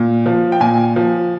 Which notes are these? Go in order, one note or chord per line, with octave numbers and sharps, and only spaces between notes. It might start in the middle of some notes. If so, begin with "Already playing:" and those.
Already playing: A#2
F3
G5
A#2 G#5
F3